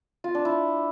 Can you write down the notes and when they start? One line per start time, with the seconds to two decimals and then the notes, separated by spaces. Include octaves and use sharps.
0.24 F4
0.35 D4
0.45 E4